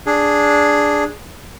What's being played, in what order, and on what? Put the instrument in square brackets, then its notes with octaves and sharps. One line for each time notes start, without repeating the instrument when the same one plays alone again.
[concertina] D4 G#4